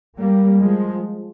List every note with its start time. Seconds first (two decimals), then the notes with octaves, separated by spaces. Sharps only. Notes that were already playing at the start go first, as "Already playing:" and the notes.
0.17 G3 A#3
0.61 F3 G#3